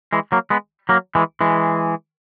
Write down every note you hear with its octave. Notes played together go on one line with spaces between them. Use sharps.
E3 G#3
F#3 A#3
G#3 B3
F#3 A#3
E3 G#3
E3 G#3